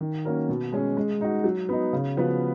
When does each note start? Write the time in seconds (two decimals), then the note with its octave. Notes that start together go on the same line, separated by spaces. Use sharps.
0.01 D#3
0.25 A#3 C#4 F#4 A#4
0.49 B2
0.72 G#3 C#4 G#4
0.97 G#3
1.21 D#4 F#4
1.44 F#3
1.69 B3 D#4
1.93 C#3
2.17 F3 B3 F#4 B4